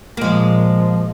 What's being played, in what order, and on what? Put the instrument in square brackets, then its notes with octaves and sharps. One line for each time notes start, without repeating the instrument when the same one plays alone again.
[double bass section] A#2 [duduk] F3 [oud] G#3 A#3